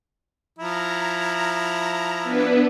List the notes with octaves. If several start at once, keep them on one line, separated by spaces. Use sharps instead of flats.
F3 E4 A#5
B3 D4 B4